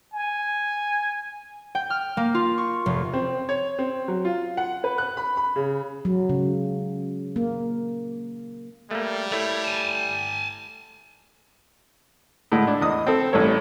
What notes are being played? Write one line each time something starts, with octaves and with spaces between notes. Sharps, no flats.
G#5
G5
F6
A#3
F4
C#6
F1
C4
C#5
C4
F#3
F4
F#5
B4
F#6
B5
B5
C#3
F#3
C#3
A#3
G3 A3 A#3
A3 E4 C#5
G#5 A5
A2 D3 G#3
D4
E2 D#5 D#6
C4 A4
A1 G2 A4 C#5